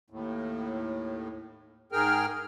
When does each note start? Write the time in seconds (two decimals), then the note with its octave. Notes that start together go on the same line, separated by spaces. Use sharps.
0.10 D#2 A2
1.92 G#2 G#4 A#4 G5 F6